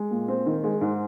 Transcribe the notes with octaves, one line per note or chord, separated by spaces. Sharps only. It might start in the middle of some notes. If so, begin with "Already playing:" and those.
Already playing: G#3
A#2
C4
D#3
G#3
G#2